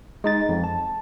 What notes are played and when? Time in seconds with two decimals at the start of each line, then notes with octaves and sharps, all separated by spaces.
0.24 G#3 D#4 A6
0.49 F2
0.64 A5